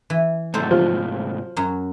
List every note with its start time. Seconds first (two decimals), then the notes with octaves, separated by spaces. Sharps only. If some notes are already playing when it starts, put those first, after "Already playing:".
0.10 E3
0.54 G#2 C3 F#3 A3 A4 C5
0.71 F3
1.57 F#2 F#3